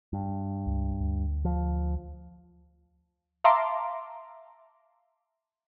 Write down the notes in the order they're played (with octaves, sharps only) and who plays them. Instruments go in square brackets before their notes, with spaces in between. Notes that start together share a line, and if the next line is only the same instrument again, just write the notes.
[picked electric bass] G2
[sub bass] C#2
D2
[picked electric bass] F3
[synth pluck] E5 F5 A5 A#5 C6 D6